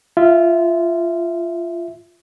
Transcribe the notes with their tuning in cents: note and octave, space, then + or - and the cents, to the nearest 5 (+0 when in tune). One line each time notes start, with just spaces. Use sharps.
F4 -15 E5 +0